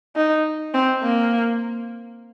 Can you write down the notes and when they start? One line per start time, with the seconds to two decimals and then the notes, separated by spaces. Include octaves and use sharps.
0.16 D#4
0.74 C4
1.03 A#3